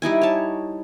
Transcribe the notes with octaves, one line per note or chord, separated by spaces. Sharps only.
G3 D#4 E4 G#5
C#5 A5